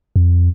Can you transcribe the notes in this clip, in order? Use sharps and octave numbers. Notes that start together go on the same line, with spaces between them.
F2